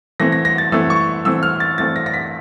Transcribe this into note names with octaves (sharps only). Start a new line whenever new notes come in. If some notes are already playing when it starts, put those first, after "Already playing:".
E3 A3 C4 A#6
A#6
A#6
A6
E3 A3 C4 E6
C#6
E3 A3 C4 E6
F6
A6
E3 A3 C4 A6
A#6
A#6
B6